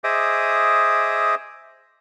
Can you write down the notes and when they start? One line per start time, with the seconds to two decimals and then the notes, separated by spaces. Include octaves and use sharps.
0.04 G#4 C5 D#5 E5 D6 D#6